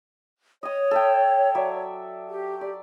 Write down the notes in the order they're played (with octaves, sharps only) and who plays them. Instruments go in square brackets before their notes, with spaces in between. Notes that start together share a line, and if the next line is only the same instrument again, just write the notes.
[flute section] C#5 [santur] D#5 D#6
[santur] A4 E5 G5
F#3 D5 E5
[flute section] G4
[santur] D5